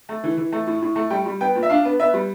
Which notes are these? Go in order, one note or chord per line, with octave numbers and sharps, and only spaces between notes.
A3
E3
E3
A3
A2
A2
A3
G3 G5
G3
B3 G5
A#2
E5
D4 F5
B3
B3 E5
G3